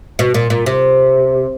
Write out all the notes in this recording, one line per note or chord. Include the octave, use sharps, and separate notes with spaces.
B2
A#2
A#2
C3